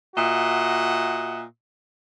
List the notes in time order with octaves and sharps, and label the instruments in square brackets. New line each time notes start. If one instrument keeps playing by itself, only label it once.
[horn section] A#2 F#4 D#5 E5 F#5